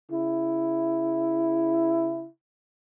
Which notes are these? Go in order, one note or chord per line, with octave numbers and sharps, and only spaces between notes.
C#3 E4